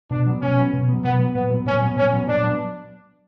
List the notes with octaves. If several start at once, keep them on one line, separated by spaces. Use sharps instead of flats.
B2 D4
F#3 B3
B2 C#4
F#3 B3
B2
F#3 B3
B2 B3
F#3 B3
A#2 B3
F#3 B3
A#2 C#4
F#3 B3
A#2 C#4
F#3 B3
A#2 D4
F#3 B3